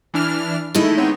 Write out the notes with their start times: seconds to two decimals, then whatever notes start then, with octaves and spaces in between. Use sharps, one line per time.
0.14 E3 D4 F6
0.75 D#3 G#3 A3 D#4 E4
0.97 B3 C4 C#5